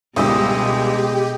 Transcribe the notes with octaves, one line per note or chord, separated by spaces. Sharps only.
C#2 B2 D3 G3 G#3 G4 D#5 E6